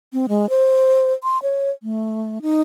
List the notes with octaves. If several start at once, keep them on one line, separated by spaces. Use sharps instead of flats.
C4
G#3
C5
C6
C#5
A3
D#4